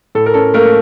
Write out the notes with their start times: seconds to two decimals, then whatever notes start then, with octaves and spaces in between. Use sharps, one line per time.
0.15 A2 A4
0.26 A#4
0.34 C#4 A4
0.54 A3 A#3 A#4